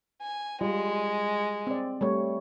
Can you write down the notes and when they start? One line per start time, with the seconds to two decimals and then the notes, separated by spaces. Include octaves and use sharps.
0.22 G#5
0.61 G3 G#3 F4
1.67 C4 D5
2.01 G3 A3 C#5